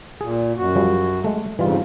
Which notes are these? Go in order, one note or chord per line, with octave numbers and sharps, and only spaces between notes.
A#2 G#4
F#2 F#4
F3 G3
G#3 A3
F2 G#2 C#3 E3 G3 F4